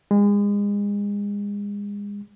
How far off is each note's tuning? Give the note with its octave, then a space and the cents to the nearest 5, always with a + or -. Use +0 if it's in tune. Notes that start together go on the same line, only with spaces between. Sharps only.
G#3 -35